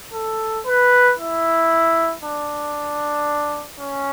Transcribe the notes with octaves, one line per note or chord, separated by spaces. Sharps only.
A4
B4
E4
D4
C#4